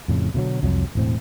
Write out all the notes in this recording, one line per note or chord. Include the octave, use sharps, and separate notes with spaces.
F2 A2 C#3
B2 D3 F3 F#3
C2 F2 F#3
E1 A2 C4